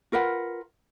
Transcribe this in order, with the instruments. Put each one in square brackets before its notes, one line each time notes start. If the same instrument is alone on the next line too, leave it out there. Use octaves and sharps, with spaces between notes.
[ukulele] F4 A#4 B4 F#5